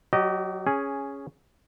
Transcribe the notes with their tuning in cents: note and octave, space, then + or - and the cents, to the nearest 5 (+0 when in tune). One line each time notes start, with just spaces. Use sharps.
F#3 +0 G4 -35 D#5 -20
C#4 +0 G#4 +0